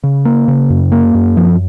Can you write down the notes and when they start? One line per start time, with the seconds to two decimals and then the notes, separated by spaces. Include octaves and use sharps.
0.04 C#3
0.25 A#3
0.48 C#3
0.70 F#2
0.92 A#3
1.15 F#2
1.37 F3